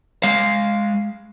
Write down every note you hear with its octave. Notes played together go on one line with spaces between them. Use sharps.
G#3 F5